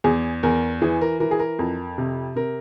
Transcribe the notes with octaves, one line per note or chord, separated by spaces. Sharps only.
E2 G#4
E2 A#4
E3 G#4
A#4
E3 A#4
G#4
A#4
F2
C3
C3 A#4